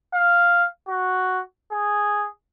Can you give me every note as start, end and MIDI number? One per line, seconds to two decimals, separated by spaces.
0.14 0.65 77
0.88 1.41 66
1.72 2.28 68